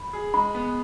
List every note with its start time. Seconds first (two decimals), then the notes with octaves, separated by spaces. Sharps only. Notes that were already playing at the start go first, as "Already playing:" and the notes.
Already playing: B5
0.13 G#4
0.34 G#3 B5
0.55 B3